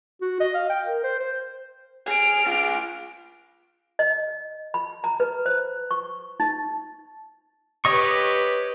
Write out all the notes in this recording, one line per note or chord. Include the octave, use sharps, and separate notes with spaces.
F#4
D#5
F5
G5
A#4
C5
C5
G#4 F6 D7
F4 G#4
D#5
B5
A#5
B4
C5
C#6
D#4
G4 B4 C#5 D#5 C#6